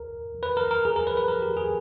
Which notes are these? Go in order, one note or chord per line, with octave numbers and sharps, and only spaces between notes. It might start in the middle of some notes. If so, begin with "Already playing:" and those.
Already playing: A#4
B4
A#4
A#4
G#4
A#4
B4
B4
A#4
G4
G#4